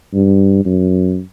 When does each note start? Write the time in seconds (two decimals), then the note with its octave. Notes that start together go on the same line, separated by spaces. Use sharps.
0.14 G2
0.65 F#2